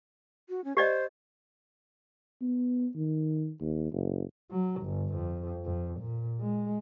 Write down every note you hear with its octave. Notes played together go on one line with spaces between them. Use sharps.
F#4
C#4
G4 C5 D5 D#5
B3
D#3
D#2
F#1
F#3
G1
F2
F2
A#2
G#3